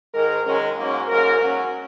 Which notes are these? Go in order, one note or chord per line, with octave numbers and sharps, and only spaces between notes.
G#2 D#3 G#3 A#4
F#2 D#3 G#3 C#4
G#2 F#3 A#3 C#4
G#2 F#3 A#3 A#4
F#2 F#3 C#4